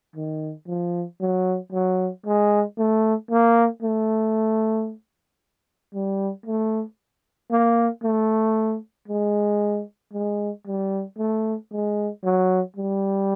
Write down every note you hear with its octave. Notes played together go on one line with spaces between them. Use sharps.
D#3
F3
F#3
F#3
G#3
A3
A#3
A3
G3
A3
A#3
A3
G#3
G#3
G3
A3
G#3
F#3
G3